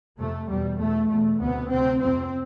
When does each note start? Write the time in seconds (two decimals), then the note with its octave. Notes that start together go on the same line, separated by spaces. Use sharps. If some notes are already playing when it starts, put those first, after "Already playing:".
0.19 F2 C3 A3
0.49 E2 B2 G3
0.80 E2 B2 A3
1.10 E2 B2 A3
1.41 D2 C3 B3
1.71 D2 C3 C4
2.01 F2 C3 C4